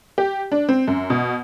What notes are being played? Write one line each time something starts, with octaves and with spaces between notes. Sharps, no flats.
G4
D4
C4
F#2
B2